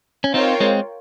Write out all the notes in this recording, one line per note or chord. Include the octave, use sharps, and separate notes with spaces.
C#4
C4 D#4 F4 A#4 C#5 G5
G#3 C4